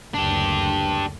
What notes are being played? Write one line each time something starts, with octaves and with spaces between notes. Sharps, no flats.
F#1 D2 D4 G4